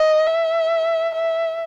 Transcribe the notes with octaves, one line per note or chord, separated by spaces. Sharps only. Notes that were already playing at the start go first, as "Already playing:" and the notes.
Already playing: D#5
E5
E5